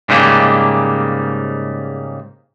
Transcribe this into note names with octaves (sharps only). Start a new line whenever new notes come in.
G#2 C#3 G3 A3 A#3